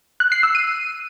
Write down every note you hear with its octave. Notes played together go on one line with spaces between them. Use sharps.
F#6
C7
E6
D#7